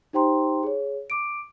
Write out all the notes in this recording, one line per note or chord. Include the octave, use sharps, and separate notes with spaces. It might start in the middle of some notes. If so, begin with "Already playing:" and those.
D#4 G4 C5 G5 A#5 C6
G#4 C#5
D6 D7